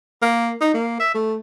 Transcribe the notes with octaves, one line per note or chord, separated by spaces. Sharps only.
A#3
D#4
A#3
E5
A3